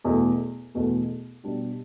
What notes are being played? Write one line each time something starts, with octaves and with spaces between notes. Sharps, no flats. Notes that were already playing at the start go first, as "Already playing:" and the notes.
E2 B2 A3
E2 B2 A3
B2 G3 D4 G4